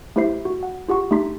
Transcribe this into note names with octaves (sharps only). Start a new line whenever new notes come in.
A3 E4 G4 C5 E5 C7
F#4
F#5
F4 G4 F#5 C#6
A3 D4 D#4 G4 C6 B6